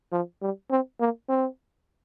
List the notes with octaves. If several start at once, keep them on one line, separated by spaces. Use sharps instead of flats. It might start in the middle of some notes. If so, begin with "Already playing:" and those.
F3
G3
C4
A#3
C4